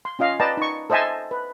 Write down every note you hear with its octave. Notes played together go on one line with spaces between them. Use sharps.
C6
C#4 F4 D#5 F5
B4 D5 D#5 G5 A5 A#5
D#4 C#6
A4 C5 D#5 E5 G#5 A5
B4